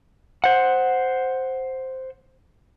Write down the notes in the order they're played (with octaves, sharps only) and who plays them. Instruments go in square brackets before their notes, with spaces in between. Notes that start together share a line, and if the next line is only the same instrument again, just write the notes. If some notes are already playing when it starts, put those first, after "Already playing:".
[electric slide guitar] C5 F#5